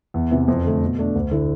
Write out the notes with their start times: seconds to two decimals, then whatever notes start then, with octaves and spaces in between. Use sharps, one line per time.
0.14 E2
0.31 C3 E3
0.48 F2
0.65 D3 A3
0.82 B2
0.99 A3 D4
1.16 D2
1.31 D3 A3 E4